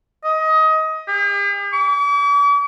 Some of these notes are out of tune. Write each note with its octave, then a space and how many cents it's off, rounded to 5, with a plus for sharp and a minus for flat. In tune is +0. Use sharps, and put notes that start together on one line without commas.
D#5 +20
G4 +45
D6 -45